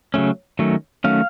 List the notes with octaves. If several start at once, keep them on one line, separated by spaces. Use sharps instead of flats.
C#3 F#3 A3 C#4
D#3 F#3 A3 C#4
D#3 F#3 A3 C#4 F5